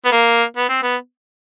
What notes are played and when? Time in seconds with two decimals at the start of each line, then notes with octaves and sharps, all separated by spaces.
0.05 B3
0.12 A#3
0.57 B3
0.69 C4
0.83 B3